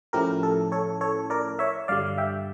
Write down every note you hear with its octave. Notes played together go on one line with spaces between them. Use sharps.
A2 F3 A3 C#4 E4 G4 A#4
A4
A4 C#5
A4 C#5
A#4 D5
C#5 E5
G2 D3 G3 D5 F5
E5 G5